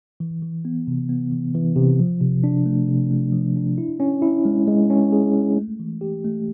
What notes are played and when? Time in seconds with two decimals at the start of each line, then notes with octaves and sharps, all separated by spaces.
0.20 E3
0.42 E3
0.65 B3
0.87 C3
1.09 B3
1.31 E3
1.55 E3
1.76 C3
2.00 F3
2.21 C3
2.44 D4
2.66 A3
2.88 C3
3.10 A3
3.33 F3
3.56 D4
3.78 E4
4.00 C#4
4.22 E4
4.45 G#3
4.67 G#3
4.90 C#4
5.12 G#4
5.34 G#3
5.56 A3
5.80 E3
6.01 G4
6.24 A3